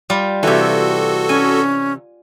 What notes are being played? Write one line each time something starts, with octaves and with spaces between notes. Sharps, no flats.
G3 F4
C3 E3 F#4 A4
C#4 G#5